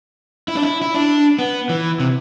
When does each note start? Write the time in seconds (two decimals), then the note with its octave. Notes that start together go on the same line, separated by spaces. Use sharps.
0.48 E4
0.56 D4
0.63 E4
0.82 E4
0.95 D4
1.39 B3
1.69 E3
2.00 C3